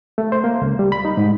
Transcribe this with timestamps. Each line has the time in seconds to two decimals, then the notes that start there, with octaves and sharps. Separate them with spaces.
0.18 A3
0.32 C5
0.44 A#3
0.62 C#2
0.79 G3
0.92 B5
1.05 D#4
1.17 G#2